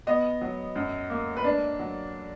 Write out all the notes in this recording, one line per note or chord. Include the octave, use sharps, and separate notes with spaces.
B3 D#5
F#3
F#2
A#3
B4
D4 D5
F#3